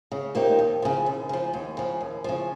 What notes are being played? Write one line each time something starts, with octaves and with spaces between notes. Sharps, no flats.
C#3
F3 A#3 D#4 G4
D#2
C#3 F3
D#2
C#3 F3
D#2
C#3 F3
D#2
C#3 F3